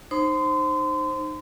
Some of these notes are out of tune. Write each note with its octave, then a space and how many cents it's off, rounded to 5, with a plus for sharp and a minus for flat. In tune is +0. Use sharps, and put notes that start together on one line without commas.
D#4 -20 C5 +10 C6 -30